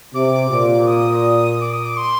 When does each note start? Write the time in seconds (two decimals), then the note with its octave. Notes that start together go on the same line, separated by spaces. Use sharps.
0.14 C3 D6
0.50 A#2
0.87 D#6
1.61 D6
1.73 D#6
1.85 D6
1.97 C6